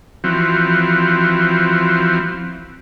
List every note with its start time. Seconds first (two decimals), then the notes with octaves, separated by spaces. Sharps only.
0.24 E3 F3 C4 F#4